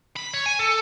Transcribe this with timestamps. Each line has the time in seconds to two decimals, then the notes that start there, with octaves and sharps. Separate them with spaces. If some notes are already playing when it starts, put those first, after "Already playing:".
0.16 B5
0.33 C#5
0.46 G#5
0.59 A4